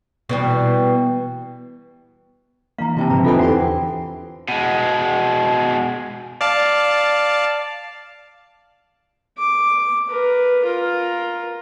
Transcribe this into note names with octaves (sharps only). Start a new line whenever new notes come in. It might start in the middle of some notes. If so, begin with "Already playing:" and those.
B2 E3 G3
E3 A#3 F5 A#5
C3 C4 E4 E5 G5 A5
G#2 D3 F3 B4 A5 A#5
E3 D4 D#4 F4 A4 C5 G#5
E2 F#4 G4 C5 F#5 G#5
B2 G#3
D5 F5 A5
D6
A#4 B4
F4 A#4